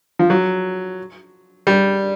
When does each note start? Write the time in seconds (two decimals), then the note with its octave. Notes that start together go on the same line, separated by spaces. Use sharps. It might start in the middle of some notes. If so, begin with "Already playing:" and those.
0.19 F3
0.30 F#3
1.67 G3